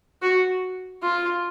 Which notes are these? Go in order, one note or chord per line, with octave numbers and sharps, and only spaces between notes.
F#4
F4